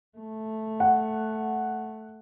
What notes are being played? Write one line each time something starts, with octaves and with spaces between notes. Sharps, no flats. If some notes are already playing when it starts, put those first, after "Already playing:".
A3
F#5